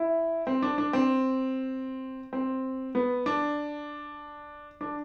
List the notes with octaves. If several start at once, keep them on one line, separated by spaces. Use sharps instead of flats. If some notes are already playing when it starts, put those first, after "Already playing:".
Already playing: E4
C4
D4
D4
C4
C4
B3
D4
D4